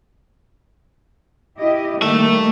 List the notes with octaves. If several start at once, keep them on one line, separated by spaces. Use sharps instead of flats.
E4 G4 D#5
D#3 G3 A3 A#3 E5